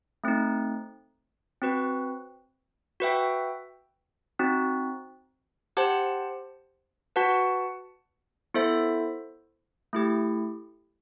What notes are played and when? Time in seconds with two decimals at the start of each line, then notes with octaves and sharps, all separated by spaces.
0.24 A3 C4 D#4
1.62 C4 F#4 B4
3.00 F#4 B4 E5 G5
4.39 C4 D#4 F#4
5.77 G4 C5 F#5 A5
7.16 F#4 B4 F#5 A5
8.54 B3 E4 A4 C5 E5
9.93 A3 E4 G4